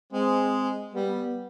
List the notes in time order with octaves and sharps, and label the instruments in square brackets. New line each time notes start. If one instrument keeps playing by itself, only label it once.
[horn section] G#3 C4
G3 B3